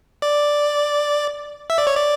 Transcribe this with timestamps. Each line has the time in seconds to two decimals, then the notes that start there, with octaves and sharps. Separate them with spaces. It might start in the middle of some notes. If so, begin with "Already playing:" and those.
0.22 D5
1.70 E5
1.78 D5
1.87 C#5
1.95 D5